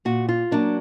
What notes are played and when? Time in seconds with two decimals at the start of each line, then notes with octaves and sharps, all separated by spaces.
0.05 A#2 F#4
0.29 F4
0.51 F#3 A#3 D4